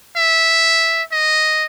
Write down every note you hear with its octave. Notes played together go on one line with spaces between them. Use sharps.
E5
D#5